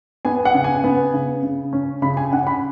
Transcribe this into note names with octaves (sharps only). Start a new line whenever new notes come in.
B3 G#5
F#5
C#3
G#5
B3
C#3
C#3
C#4
C#3 B5
G#5
C#3 F#5
B5